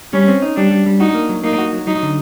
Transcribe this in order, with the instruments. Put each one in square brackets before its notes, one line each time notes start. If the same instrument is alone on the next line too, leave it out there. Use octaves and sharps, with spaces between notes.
[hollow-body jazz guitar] G3 [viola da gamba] C#4
[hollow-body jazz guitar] C4
D#4
[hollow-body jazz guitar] G3 [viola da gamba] D4
[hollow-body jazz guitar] G3
G3
[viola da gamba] D#4 [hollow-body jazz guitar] F#4
[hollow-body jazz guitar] A#3
F#3
[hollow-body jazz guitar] A#3 [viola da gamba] D#4
[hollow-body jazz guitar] F#4
F#3
[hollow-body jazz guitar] F#3 [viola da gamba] D#4
[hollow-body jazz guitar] D3